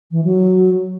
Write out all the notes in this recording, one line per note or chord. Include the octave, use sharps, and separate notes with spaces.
E3
F#3